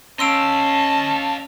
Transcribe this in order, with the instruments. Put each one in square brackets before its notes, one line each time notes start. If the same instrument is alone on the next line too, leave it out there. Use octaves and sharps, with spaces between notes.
[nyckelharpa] C#4 [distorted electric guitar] D#5 F5 [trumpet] A5 [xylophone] C6 E6 D7